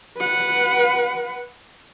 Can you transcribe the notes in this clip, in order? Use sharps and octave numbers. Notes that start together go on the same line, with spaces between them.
B4 F#5